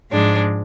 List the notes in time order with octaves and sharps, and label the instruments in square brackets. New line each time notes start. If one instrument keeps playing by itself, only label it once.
[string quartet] G#2 F3 G#3 D4